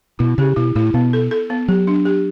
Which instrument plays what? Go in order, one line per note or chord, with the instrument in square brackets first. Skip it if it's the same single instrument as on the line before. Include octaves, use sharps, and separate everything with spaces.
[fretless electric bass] B2 [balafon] E4
[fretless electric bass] C#3 [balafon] G4
[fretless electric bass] B2 [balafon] E4
[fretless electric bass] A2 [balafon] E4
[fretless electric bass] B2 [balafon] B3
[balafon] A4
A4
B3
[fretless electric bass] F#3 [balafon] G4
[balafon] D4
G4